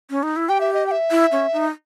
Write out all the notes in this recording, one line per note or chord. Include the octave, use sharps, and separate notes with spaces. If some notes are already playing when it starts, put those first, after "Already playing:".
C#4
D#4
E4
G4 G5
E5
D#5
G5
E5
E4
C#4
D#4